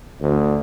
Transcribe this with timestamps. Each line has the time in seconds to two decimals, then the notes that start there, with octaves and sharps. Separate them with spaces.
0.21 D2